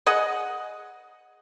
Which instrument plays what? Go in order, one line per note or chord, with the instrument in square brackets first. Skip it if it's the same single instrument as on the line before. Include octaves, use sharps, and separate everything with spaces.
[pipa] G#4 D#5 F#5